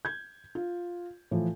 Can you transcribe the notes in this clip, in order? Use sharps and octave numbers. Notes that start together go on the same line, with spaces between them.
G6 G#6
F4
A2 E3 F3